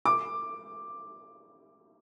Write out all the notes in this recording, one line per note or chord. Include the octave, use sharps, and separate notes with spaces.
D6